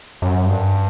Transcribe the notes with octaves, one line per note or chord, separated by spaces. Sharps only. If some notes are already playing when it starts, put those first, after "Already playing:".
F#2
G2